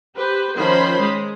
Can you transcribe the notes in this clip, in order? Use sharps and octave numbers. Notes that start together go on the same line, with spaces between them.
G4 B4 C5
D#3 F3 C#4 C5 B5 C6
G#3